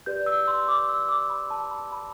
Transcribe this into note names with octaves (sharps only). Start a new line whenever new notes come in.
G4 B4 D5 G6
E6
C6
D6
E6
D6
B5
A5
B5
B5